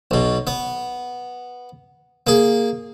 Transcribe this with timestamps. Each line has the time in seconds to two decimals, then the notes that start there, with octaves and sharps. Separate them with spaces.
0.11 B1 B2
0.47 B3
2.27 A#3 G#4